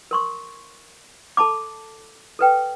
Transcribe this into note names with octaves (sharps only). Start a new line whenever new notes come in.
A#4 C6 C#6
A4 A5 B5 D6
A4 B4 G5